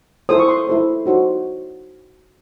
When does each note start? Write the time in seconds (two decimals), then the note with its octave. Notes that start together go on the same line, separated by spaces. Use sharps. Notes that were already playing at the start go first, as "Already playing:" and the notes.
0.29 E4 A4 C5 D#6
0.39 C#6
0.48 C6
0.67 E4 A4 C5
1.06 D#4 F#4 C5